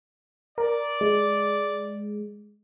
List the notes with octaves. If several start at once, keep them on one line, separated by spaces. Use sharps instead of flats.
A#4 D5
G#3